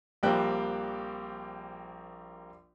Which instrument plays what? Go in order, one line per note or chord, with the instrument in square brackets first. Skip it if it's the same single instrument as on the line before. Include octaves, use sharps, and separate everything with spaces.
[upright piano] A#1 G3 A#3 C4 G5 F#6